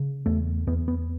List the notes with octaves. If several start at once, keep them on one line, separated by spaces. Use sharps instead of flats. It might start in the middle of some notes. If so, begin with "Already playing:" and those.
Already playing: C#3
E2 A3
E2 B3
B3